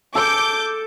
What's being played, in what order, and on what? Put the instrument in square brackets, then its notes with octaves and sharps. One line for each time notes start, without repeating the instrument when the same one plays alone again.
[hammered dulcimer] A4 [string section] D6 G6